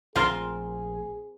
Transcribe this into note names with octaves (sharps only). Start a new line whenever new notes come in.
A#1 A3 C4 F4 G#4 A#4 F5 C6